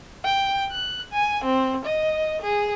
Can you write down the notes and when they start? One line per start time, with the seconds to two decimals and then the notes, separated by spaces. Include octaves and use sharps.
0.24 G5
0.72 F#6
1.12 G#5
1.44 C4
1.85 D#5
2.42 G#4